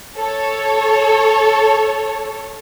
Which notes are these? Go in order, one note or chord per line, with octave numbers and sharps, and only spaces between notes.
A4 C#5